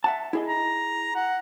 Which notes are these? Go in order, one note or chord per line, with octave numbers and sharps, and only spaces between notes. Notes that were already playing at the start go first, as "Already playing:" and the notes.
E5 F#5 A5
E4 G#4 D#5
A#5
F#5